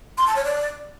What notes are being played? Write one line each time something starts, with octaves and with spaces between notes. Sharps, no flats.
C6
A5
C#5
D5